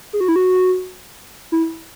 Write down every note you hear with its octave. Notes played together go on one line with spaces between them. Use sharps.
G#4
F#4
E4
F#4
E4